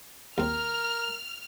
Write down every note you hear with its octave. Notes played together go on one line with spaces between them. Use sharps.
D#2 C4 A#4 F6